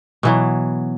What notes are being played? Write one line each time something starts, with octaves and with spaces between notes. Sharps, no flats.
B2 E3 F#3